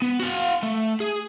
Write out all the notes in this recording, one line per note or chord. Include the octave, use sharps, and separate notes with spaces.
B3
F#4 F5
A3
G#4